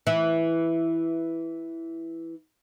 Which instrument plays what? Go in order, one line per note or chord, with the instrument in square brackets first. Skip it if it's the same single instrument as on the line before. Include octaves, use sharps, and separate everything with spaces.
[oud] E3 E4